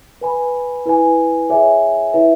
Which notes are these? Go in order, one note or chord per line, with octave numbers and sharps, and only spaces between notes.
B4 G#5 B5
E4 B4 G#5
G#4 C#5 E5 G#5
E4 B4 E5